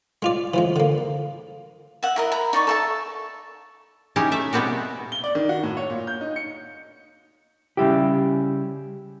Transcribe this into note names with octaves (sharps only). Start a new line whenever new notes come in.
G#3 F4 D5
E3 F3 G#3
D3 A#3
E5 F#5
E4 A#4 D#5
A#5 B5
D#4 D5 C#6
A4 E5 A5
C#4 D#4 E4 G4 G#4
A3 E5
B2 G3 B3 C4 F#4 G4
G7
D5
D#3
F#4
A2
C#5
A#2
G6
D#4
C#7
C#3 G3 E4 G4